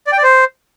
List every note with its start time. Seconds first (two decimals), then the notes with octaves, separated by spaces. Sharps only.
0.07 D5
0.12 G5
0.18 D5
0.23 C5